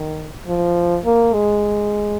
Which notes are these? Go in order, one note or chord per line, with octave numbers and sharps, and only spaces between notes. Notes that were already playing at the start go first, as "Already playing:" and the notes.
Already playing: D#3
F3
A#3
G#3